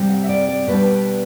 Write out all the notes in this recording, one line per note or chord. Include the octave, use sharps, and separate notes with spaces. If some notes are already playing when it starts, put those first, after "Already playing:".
Already playing: C3 G3 C4
F#5
E5
D5
D5
B2 G3 B3 D4 B4